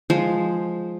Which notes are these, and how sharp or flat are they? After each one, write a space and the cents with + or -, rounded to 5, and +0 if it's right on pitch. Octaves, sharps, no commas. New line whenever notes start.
F3 +0 G#3 +0 C5 +0